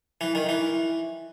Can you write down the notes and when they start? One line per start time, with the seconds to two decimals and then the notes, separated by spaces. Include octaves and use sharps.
0.21 E3
0.35 D#3
0.49 E3